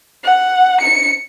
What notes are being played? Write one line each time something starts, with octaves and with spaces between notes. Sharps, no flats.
F#5
C#7